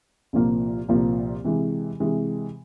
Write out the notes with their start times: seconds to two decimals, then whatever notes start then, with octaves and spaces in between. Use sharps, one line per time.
0.33 C2 A#2 F3 A#3
0.89 C2 A#2 F3 A#3
1.44 C3 E3 G#3
2.00 C3 E3 G#3